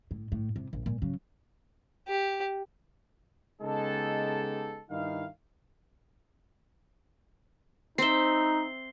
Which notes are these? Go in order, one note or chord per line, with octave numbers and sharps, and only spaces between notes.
A2
A2
C3
A#1
A#2
C#3 F#3
G4
C#3 G#3 B3 D#4 G4 A4
G2 D#3 D#4 E4 F5
C4 D#4 E5 C7 G7